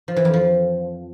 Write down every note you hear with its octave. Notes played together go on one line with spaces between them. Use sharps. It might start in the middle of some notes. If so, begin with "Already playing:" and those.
F3
E3
F2
F3